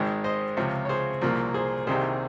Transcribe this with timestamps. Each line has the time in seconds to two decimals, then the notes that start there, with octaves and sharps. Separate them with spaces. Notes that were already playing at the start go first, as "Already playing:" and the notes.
Already playing: G#1 G#2 D#3 G#3
0.24 C5 D#5
0.57 C#2 C3 F3
0.85 C#5
0.89 G#4 C5
1.21 C2 A#2 F3 A#3
1.54 G#4 C5
1.87 C2 C3 D#3 G3 G#4 C5